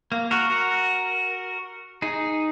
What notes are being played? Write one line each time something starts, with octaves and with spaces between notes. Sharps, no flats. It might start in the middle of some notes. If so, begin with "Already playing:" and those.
A#3
F#4 A#4
F#4 A#4
D#4 G#4